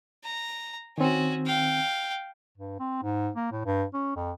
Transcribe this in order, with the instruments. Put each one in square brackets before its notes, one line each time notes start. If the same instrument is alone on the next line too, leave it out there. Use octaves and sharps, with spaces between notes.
[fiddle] A#5
[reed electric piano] D#3 C4 [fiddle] C#4 F#4
[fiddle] F5 G5
[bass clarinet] G2
C4
G#2
A#3
A2
G2
C#4
F2